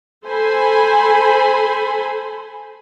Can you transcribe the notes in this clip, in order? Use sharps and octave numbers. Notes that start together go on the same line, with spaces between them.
A4 C5 G#5 B5